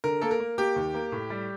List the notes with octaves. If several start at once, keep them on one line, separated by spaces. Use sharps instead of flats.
D3 A#4
A#3 A4
A#4
A#3
A#3 G4
D#2
A#3
A2
G3